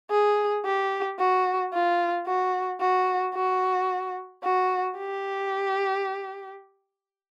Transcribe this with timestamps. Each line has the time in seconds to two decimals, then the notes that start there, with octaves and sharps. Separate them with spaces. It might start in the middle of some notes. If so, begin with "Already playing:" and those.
0.11 G#4
0.66 G4
1.20 F#4
1.73 F4
2.27 F#4
2.81 F#4
3.35 F#4
4.44 F#4
4.97 G4